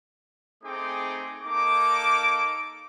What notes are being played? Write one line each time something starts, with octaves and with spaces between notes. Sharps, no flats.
A3 C4 D#4 G#4 G5 D6
A#3 D#4 A4 D6